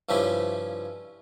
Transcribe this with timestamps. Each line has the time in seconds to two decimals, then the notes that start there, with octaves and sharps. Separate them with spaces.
0.09 G2 C#3 F3 C#4 E4 G4